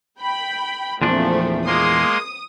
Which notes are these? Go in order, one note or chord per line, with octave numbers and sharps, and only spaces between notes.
G5 B5
E2 A#2 F3 A3 C4 D4
G#3 A#3 C6 D#6